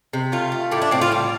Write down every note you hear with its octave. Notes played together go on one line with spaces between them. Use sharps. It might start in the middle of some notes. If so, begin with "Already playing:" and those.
C3
A3 F4
A3
A2 G4
D4
A2 C4
F4
G3